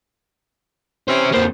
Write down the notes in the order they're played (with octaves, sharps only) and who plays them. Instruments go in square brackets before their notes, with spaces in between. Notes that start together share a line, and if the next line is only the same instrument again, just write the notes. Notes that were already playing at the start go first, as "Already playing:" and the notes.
[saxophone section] E3 C#4 [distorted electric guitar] G4 C5
[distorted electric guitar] F2 A#3 [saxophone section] A2 B3 C5